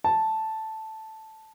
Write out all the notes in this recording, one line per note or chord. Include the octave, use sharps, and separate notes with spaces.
A5